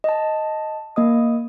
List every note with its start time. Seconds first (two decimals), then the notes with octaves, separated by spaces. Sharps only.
0.04 D#5 A5
0.96 A#3 D#5 D#6